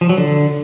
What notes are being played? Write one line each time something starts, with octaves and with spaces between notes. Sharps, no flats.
F3
F#3
D3